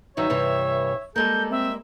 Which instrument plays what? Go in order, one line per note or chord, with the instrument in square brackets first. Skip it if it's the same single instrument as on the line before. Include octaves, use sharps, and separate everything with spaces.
[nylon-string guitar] G2 D#3 F#3 [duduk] C#5 [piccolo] E5
[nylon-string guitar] G2 C3 E3
[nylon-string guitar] G3 G#3 A#3 [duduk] A4 [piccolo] G6
[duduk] C4 [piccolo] E5